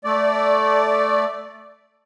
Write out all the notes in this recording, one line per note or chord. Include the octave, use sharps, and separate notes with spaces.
A3 D5